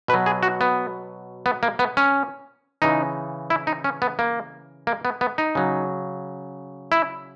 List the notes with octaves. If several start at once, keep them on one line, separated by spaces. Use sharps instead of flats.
B2 B4
F#3
G#4
F#4
B3
B3
A#3
B3
C#4
C#3 E3 D#4
E4
D#4
C#4
B3
A#3
A#3
B3
B3
D#4
C#3 F#3
E4